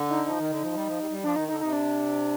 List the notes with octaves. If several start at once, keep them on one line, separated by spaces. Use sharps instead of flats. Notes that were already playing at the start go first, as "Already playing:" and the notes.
Already playing: D3
D#4
F3 D#4
D#3
D3
F3
G3
F3
G3
G3
F3 D4
D#3 D#4
D3 D#4
C3 D#4
D4